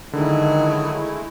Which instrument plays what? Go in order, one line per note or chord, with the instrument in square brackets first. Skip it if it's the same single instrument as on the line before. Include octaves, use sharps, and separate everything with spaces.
[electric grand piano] D3 [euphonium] D#3 [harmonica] F#3 G#4 A4 [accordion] G#3 A3 E4